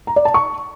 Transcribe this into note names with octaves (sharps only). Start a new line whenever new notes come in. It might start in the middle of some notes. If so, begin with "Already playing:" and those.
A#5
D5
A5
C#6